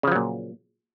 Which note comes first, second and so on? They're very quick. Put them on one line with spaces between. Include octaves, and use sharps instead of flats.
C#3 F3 F#3 A#2